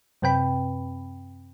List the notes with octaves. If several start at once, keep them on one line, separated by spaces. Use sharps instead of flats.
F#2 C3 C4 B4 G5 B5